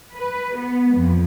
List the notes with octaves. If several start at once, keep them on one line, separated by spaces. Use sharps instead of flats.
B4
B3
F2